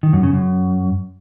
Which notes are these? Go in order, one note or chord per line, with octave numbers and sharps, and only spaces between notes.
D#3
F#2
C#3
F#2